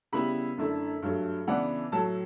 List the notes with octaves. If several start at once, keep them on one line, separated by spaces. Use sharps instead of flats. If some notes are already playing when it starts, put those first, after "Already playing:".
C#3 G3 B3 E4 B5
F#2 D3 A3 E4
G2 F#3 A3
C#3 E3 B3 D4 F#5
A2 F#3 A3 A5